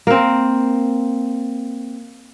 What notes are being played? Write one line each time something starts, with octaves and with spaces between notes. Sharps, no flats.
A#3 C4